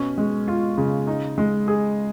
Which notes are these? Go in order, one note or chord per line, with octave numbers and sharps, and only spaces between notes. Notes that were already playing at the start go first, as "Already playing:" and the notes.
Already playing: B2 C#4
G#3
F4
C#3
D#4
G#3
G#4